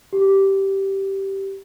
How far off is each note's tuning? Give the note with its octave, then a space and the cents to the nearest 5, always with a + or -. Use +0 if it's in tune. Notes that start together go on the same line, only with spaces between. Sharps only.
G4 -10